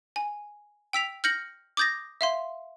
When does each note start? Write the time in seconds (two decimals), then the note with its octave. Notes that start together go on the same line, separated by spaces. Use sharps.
0.16 G#5
0.93 G5 E6 B6 F7
1.24 F6 G6 A#6 C#7 F#7
1.77 D6 D#6 G6 A6 A#6
2.21 E5 F5 C6